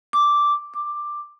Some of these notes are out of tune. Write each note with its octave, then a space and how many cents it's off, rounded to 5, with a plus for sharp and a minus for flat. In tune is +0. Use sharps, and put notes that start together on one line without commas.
D6 -5
D6 +10